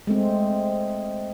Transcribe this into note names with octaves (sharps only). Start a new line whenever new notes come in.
G#3 A3 C4